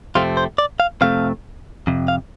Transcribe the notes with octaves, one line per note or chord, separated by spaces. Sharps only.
F2 C3 A3 C4 F4
C5
D5
F5
F2 C3 A3 C4 F5
F2 C3
F5